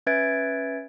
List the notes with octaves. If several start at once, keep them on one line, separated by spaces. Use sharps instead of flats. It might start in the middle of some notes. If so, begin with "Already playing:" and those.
C#4 B4 E5 G#6 A6 D7